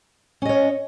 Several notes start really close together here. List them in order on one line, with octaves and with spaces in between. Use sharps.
C#4 D#5 C#5